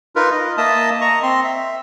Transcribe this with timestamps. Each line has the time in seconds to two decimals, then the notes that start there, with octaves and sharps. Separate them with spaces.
0.16 D#4 F4 A#4 B4
0.32 D#5
0.58 A#3 D#5 E5 A5 D#6
1.01 D#5 A#5 C#6
1.23 C4 C6
1.44 E5